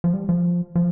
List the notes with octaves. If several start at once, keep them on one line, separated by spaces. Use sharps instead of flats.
F3
G3
F3
F3